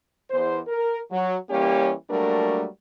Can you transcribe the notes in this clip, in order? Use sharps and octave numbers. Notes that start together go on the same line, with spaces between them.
E2 C5
A#4
F#3
E3 G3 A#3 C#4 G4 C#5
F#3 G3 A3 A#3 D4 A#4